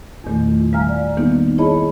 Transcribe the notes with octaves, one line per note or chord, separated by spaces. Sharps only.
E2 A#2 D#3 A3
F4
G3 E5 F5 G#5 A#5 F6
D5
D#3 A#3 B3 D#4
E4 G#4 C#5 D#5 A5 B5